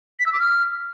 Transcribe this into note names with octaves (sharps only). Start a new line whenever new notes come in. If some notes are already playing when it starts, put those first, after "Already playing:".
B6
E6
D6
F6